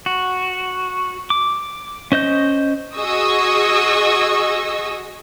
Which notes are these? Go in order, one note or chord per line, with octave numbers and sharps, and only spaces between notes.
F#4
D6
C#4 C5 D#5 G6
F#4 G#4 D#5 C#6 D#6 E6